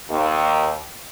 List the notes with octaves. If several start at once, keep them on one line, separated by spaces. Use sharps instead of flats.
D#2